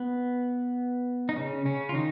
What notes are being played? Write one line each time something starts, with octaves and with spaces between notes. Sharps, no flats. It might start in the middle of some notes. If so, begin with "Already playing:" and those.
Already playing: B3
D#4
C#3 C#4
C#3 C#4
F4
D#3 D#4